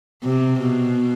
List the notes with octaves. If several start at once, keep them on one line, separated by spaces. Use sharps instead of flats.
C3
B2